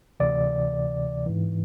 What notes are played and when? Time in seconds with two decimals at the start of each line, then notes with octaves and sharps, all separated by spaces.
0.20 D2 C3 E3 D5
1.26 G#2 E3